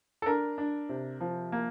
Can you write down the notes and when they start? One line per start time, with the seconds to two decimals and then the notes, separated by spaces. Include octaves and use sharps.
0.22 A4
0.26 D4 A#4
0.58 D4
0.89 C3
1.21 F3
1.52 A#3